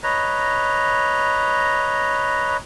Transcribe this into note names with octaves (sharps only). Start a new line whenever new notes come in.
B4 C#5 D#5 A#5